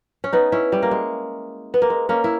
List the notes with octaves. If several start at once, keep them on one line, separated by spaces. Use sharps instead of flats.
C#4
B3 D#4
C#4 E4
G3
A#3
G#3
B3
A#3
G#3
A#3 C#4
E4